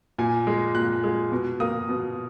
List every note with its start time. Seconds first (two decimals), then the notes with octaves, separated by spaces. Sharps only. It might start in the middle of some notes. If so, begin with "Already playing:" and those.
0.18 A#2 G#5
0.47 G#3
0.75 A#2 F#6
1.04 G#3
1.31 B2
1.60 A#3 D#6
1.89 B2